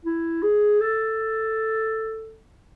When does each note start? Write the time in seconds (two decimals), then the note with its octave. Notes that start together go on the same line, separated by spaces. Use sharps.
0.05 E4
0.43 G#4
0.80 A4